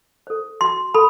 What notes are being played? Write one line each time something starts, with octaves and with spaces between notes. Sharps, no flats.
A4 C5
F#4 C6
A4 B5